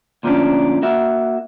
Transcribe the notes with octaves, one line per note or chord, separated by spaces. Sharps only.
D2 A#2 F3 G#3 C#4 D4
A#3 F#4 E5